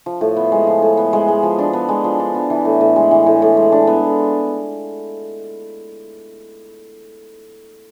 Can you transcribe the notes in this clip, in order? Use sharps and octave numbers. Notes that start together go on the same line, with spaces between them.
F3
A2
B3
G#3
F3
A2
B3
G#3
G#3
F3
D4
B3
G#3
F3
D4
B3
E3
A2
A2
G#3
E3
A2
A2
G#3
D4
B3